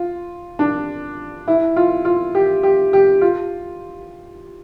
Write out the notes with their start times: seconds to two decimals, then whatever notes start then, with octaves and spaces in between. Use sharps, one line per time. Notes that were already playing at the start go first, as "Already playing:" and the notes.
Already playing: F4
0.59 D4
1.48 E4
1.76 F4
2.05 F4
2.35 G4
2.63 G4
2.93 G4
3.21 F4